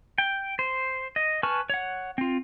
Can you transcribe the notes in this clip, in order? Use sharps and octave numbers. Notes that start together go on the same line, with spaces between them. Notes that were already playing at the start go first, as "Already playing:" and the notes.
G5
C5
D#5
B4 G#5 A5 C#6 F6
C#5 F#5
C4 F4